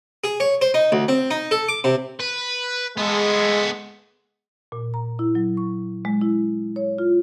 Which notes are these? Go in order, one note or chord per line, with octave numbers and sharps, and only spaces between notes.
G#4
C#5
C5
D#4
D2
C4
D#4
A4
D6
C3
B4
G#3 B3 A4
A#2
A#5
E4
F#3
C#6
G#3
E4
C#5
F4